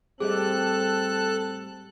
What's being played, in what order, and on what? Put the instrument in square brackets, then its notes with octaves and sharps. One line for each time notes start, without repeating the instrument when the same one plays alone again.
[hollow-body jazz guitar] A2 G3 [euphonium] C4 [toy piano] G#4 D#5 [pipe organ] A4 F#6